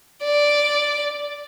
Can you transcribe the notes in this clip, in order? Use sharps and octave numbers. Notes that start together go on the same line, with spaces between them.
D5